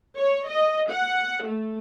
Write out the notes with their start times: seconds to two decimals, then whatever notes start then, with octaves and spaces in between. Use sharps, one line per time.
0.17 C#5
0.47 D#5
0.91 F#5
1.44 A3